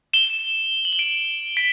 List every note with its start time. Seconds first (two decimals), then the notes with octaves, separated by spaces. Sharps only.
0.13 E7 G7
0.85 F#7
0.93 G7
0.99 D7 F#7
1.57 B6 D7